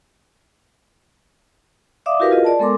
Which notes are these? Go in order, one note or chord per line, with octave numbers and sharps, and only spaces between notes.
D5 E5 F5 D6 D#6
E4 F#4 G4 A#4 B4 F5
F4 G#4 A#4 D#5
D5 A5
G#3 B3 A4 A#4 C6 D6